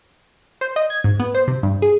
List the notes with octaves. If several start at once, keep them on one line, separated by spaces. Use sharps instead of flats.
C5
D#5
G#6
G#2
B3
C5
C3
G2
G#4